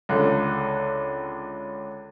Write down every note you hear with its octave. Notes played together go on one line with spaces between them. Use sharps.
C#2 D3 F#6